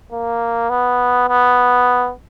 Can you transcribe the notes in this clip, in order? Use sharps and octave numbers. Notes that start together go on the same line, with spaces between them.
A#3
B3
B3